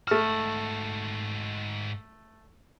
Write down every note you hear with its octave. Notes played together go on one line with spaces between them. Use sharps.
G#2 A3 F#4 F6